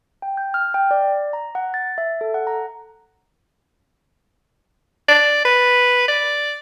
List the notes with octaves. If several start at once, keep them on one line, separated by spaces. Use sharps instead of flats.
G5
G6
F6
G5
D5
A#5
F#5
A6
E5
A4
F#5
A#5
D5
B4
D5